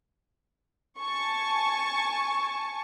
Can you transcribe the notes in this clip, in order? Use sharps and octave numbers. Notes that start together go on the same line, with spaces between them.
G#5 A5 C#6